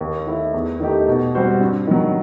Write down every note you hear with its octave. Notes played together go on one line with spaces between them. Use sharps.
D#2
D#3 A3 E4
E2
D#3 A3 D#4 G4
B2
G3 C4 F#4 C5
G2
D#3 F#3